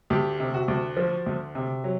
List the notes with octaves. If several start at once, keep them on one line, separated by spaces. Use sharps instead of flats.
D2 G4
C3
F#4
D2
F3
D2
C3
F#3